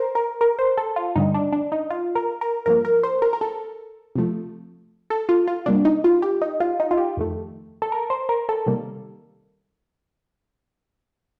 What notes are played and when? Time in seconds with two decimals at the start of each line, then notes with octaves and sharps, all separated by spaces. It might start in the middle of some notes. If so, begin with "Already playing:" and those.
Already playing: A#4 C5
0.15 A#4
0.41 A#4
0.59 C5
0.78 A4
0.96 F4
1.16 G2 D3 G3 D#4
1.34 D4
1.53 D4
1.72 D#4
1.90 F4
2.15 A#4
2.41 A#4
2.66 G2 F3 A#3 A#4
2.85 A#4
3.03 C5
3.22 A#4
3.33 A#4
3.41 A4
4.15 C3 F3 A3
5.10 A4
5.29 F4
5.47 F4
5.66 C3 G3 A#3 D4
5.85 D#4
6.04 F4
6.22 G4
6.42 D#4
6.60 F4
6.80 D#4
6.91 F4
6.97 G4
7.17 F2 D#3 A3
7.82 A4
7.92 A#4
8.10 C5
8.29 A#4
8.49 A4
8.66 C3 D#3 G3 A#3